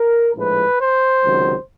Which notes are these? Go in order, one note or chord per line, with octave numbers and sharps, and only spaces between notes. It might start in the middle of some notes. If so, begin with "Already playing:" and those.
Already playing: A#4
A#1 A2 F3 G#3 B4
C5
C#2 C3 D#3 F#3